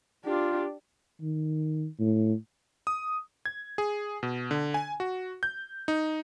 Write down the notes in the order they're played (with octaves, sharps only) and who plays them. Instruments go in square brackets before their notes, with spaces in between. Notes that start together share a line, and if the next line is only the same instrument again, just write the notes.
[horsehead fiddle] D4 G4 [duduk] F4
[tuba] D#3
A2
[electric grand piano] D#6
G#6
G#4
B2
D3
G#5
F#4
G6
D#4